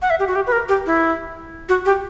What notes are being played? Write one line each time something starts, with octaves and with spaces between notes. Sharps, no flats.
F#5
E5
G4
F#4
G4
B4
A#4
G4
E4
F#4
G4